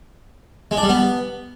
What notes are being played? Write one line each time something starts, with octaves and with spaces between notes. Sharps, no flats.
G#3
D4
G3
B3